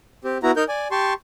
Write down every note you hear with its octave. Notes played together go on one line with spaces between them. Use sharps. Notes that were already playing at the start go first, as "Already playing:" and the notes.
C4 G4
B3 E4 F#4 A#5
D#4 A#4 G6
D5 G#5
G4 A5 C6 C#6